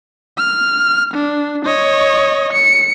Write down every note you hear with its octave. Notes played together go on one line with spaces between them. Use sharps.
F6
D4
C#5 D#5
C#7